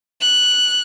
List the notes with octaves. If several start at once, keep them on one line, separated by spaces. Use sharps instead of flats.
F#6